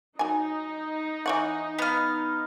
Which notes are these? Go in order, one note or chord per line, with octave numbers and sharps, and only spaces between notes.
F#3 D#4 G#5
E3 C#5 F#5
B3 F5